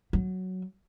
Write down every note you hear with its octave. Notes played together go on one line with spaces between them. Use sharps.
F#3